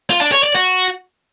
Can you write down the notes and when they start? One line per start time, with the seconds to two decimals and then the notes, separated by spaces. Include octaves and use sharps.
0.10 F4
0.21 D4
0.32 C#5
0.43 D5
0.54 F#4